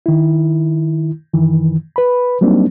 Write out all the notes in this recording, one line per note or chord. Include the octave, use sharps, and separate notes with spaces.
D#3 E4
F#2 D#3 E3
B4 B5
F#3 G3 A#3 C4 D4 D#4